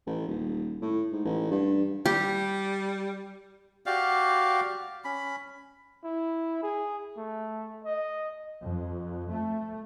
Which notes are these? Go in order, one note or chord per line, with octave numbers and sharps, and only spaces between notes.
A1
D#1
A2
G#2
A1
G2
G3 G4
F#4 G4 D5 F5
C#4 B5
E4
G#4
A3
D#5
F2
A3